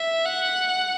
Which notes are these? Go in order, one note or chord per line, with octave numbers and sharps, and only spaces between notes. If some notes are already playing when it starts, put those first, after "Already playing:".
Already playing: E5
F#5